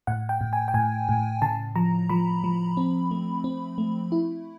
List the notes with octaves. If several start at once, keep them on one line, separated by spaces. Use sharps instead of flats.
A2 F#5
G5
A2
G#5
G5
A2 G#5
A2
C#3 A5
F3 A#5
F3 B5
F3
C4
A3
C4
A3
E4